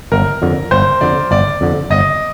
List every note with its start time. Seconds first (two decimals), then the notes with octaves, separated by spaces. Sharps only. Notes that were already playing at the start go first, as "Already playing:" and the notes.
0.12 G1 A#4
0.42 F2 D3
0.71 G1 C5
1.01 F2 D3 D5
1.31 G1 D5
1.61 F2 D3
1.90 G1 D#5